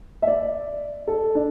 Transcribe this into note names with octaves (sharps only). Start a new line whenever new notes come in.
E5
D5
A4
D4